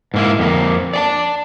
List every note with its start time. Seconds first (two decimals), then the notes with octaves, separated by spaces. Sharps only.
0.14 G#2 A#3 E4
0.39 F2 A#3
0.93 D5 G#5 A5